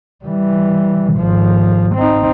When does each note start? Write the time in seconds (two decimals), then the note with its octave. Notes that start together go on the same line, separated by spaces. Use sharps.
0.25 E3 G3
1.14 G#1 F3
1.95 C4 D#4